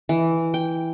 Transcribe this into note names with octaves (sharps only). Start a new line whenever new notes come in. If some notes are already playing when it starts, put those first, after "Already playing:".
E3
G5